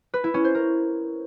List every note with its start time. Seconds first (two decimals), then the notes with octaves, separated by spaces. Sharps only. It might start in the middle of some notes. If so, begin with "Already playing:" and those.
0.14 B4
0.24 E4
0.34 C#4
0.44 C5
0.55 A#4